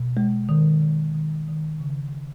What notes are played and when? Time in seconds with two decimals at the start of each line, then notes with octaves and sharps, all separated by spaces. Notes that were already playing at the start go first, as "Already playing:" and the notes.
Already playing: B2
0.17 G#3
0.49 D#3
0.82 D#3
1.14 D#3
1.48 D#3
1.80 C#3